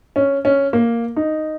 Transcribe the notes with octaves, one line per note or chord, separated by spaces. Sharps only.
C#4
C#4
A#3
D#4